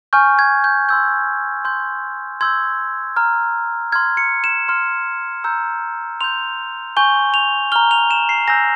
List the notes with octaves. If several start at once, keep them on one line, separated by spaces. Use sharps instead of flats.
G#5 C#6 F6 G6
G#6
G6
C6 E6 G6
C6 G6
C6 E6 G6 G#6
A#5 F6
C6 F6 G#6
C#7
E7
C6 F6
A#5 E6 G6
C6 G6 F7
G#5 C#6 G6 G7
F7
A#5 F6 G7
F7
E7
C7
G#5 E6 G6 A#6